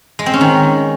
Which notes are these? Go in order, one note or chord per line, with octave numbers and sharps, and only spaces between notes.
G#3
C4
C#4
D#3